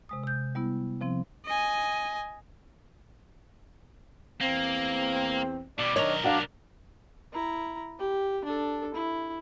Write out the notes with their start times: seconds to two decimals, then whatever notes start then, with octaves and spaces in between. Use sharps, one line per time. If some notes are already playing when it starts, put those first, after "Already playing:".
0.09 C3 G#3 D#6
0.23 C3 G6
0.55 G3 B3 E4
1.01 C3 F3 C4
1.45 D#5 G#5
4.41 E2 A#3 C4
5.79 B2 G3 D5
5.96 B1 D#3 D4 A#4 C#5 D#5
6.24 D4 F#4 F5
7.33 E4 A#5
7.99 G4
8.45 D4 A4
8.94 E4